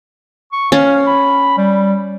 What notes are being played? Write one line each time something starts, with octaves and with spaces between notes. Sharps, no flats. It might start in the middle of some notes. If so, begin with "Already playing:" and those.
C#6
C#4 F5
B5
G3